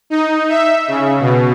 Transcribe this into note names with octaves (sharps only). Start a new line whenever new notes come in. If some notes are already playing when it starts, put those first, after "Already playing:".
D#4
E5
C#3
B2